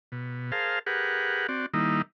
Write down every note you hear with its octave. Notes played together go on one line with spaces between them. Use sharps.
B2
G#4 A#4 C5 F5 A5
G4 G#4 A#4 B4 F#5
C4 F#4 D5
D#3 G3 A#3 D#4 E4